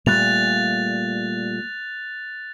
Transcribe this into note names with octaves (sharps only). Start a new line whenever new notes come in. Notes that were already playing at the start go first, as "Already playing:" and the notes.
A#2 G3 A3 F#6 A6 F7